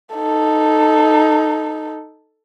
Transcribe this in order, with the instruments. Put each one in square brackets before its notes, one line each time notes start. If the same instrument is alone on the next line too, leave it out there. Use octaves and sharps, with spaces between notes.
[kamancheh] D#4 A4